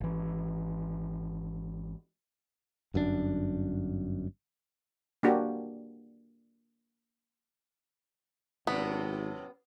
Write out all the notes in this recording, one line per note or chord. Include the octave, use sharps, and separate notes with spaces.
G#1 E3
G1 F#2 C#3 D4
A#3 D4 F#4 G4
G#1 F#2 A2 C3 B3